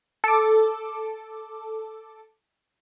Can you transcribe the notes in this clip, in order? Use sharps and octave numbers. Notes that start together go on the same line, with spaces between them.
A4 D6